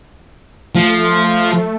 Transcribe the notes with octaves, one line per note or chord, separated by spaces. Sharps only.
F3 A3